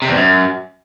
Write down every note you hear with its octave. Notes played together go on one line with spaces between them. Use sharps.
C3
E2
F#2